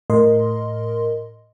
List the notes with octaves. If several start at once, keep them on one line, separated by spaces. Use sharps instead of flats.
A2 A#4 D#5 C6